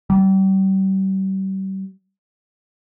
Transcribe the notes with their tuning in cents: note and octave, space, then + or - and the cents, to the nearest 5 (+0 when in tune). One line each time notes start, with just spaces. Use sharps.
G3 -35